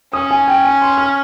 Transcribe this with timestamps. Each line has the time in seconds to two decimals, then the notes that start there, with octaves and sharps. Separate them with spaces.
0.13 C#4 D#6
0.31 G#5
0.48 G5
0.65 G#5
0.81 C6
0.98 F6